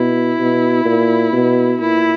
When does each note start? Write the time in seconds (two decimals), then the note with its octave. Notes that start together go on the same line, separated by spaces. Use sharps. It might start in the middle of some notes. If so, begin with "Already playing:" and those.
Already playing: B2 E4
0.40 B2
0.85 A#2
1.33 B2
1.81 A#2 E4